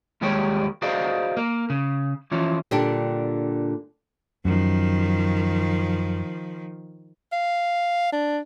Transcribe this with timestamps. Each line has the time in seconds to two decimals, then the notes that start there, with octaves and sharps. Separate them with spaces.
0.22 D#2 G3 G#3 G4 G#4 C#5
0.82 F#4 G#4 C5 D5 D#5 F5
1.37 A#3
1.70 C#3
2.32 E3 F3 C#4
2.71 A#2 D3 G3 D4 G4
4.45 F#2 D#3 F3
7.32 F5
8.13 D4